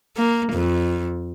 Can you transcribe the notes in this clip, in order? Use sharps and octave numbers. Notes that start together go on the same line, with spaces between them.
A#3
F2